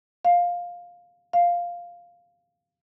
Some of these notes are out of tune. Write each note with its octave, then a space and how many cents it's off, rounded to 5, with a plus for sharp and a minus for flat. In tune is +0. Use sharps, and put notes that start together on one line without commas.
F5 +10
F5 +0